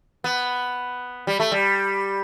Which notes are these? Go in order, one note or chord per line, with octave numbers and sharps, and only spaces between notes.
B3
G3
A3
G3